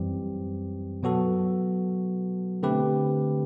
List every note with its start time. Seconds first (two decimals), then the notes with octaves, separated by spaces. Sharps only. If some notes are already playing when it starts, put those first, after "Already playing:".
Already playing: F#2 E3 G3 C4 G4
1.03 B2 F#3 B3 F#4 A4
2.63 D3 A3 C4 G4 B4